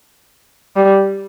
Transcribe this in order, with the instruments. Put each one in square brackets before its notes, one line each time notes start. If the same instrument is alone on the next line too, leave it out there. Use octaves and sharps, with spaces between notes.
[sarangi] G3